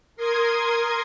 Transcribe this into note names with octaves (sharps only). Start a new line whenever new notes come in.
A#4 C6 D#6 G#6